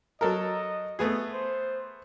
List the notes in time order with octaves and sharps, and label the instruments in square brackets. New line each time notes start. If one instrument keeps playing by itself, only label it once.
[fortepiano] F#3 A4 A#4 [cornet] D#5
[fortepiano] A3 B3 G#4
[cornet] C5